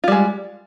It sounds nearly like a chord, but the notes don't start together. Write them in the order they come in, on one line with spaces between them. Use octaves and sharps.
F4 G3 G#3